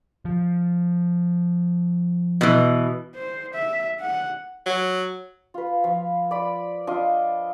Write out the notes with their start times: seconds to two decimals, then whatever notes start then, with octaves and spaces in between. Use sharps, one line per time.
0.25 F3
2.41 B2 E3
3.15 C5
3.54 E5
4.01 F#5
4.66 F#3
5.54 F4 B4
5.84 F3
6.31 D5 B5
6.87 D4 F4 D#5